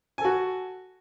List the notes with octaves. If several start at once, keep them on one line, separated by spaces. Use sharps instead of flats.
F#4 A4 G#5